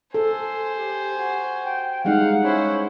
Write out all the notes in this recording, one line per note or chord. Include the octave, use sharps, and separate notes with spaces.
A4 C5 G#5
G4
F#4
G5
G3 G#3 D#4 F5 F#5
C#4 E4 C5